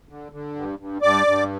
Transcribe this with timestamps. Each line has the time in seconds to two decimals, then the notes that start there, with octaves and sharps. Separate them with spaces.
0.09 D3
0.32 D3
0.55 G2
0.79 G2
1.02 G2 D5 D6
1.26 G2